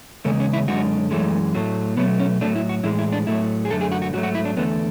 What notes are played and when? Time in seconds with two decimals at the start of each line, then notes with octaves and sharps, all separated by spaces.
0.25 E2 C#3 G#3 A3
0.40 C#4
0.54 E4
0.68 F#2 D3 G#3 F#4
1.11 F#2 E3 G#3 A3
1.55 A2 F#3 A3
1.97 B2 F#3 A3 B3
2.20 C#4
2.41 A2 F#3 A3 D4
2.56 E4
2.69 F#4
2.83 A2 E3 G#3 E4
2.99 E4
3.12 D4
3.27 A2 F#3 A3 E4
3.65 G#4
3.70 F#2 D3 A3 A4
3.81 G#4
3.92 F#4
4.02 F#4
4.13 G#2 F#3 A3 F#4
4.23 F#4
4.35 E4
4.45 D4
4.57 E2 D3 A3 B3